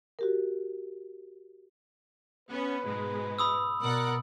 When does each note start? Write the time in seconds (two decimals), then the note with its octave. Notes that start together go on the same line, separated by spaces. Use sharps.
0.19 F#4 G4 A#4
2.49 B3 C#4 B4
2.85 G#2 B2 G#3
3.39 B5 D#6 E6
3.82 B2 A#4 D5 F#5